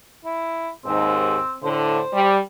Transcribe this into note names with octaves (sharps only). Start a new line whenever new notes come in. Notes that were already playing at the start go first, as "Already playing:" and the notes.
E4
D#2 G#2 C4
A2 D3 C5
G3